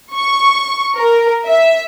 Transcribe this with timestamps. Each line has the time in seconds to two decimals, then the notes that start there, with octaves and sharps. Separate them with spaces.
0.15 C#6
0.97 A#4
1.46 E5